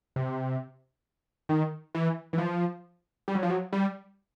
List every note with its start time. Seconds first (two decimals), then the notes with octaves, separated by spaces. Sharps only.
0.16 C3
1.49 D#3
1.95 E3
2.33 E3
2.38 F3
3.28 G3
3.35 F#3
3.43 F3
3.50 F#3
3.73 G3